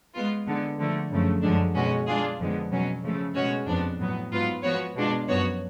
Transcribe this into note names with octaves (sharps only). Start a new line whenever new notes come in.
G#3 B3 F4
D3 G#3 B3
D3 F3 A3
F#2 C#3 F3 A3
F#2 D3 F3 G#3 D4
B2 G#3 C#4 F#4
G#3 D4 F4 G#4
F2 D3 F3 G#3 B3
B2 F#3 C#4
C#3 F3 A3
B2 G#3 C#4 F#4 C#5
F2 F3 B3 D4
A2 F#3 B3
G#2 F#3 B3 F4 B4
F3 B3 F#4 C#5
B2 G#3 D4 F4
F#2 F3 B3 F#4 C#5